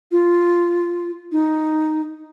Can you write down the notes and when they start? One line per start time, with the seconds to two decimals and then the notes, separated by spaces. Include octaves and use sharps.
0.11 F4
1.32 D#4